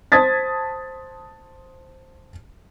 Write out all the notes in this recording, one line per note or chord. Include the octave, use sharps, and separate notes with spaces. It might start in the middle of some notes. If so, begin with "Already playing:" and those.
C5 A5 D#6 G#6 A6 B6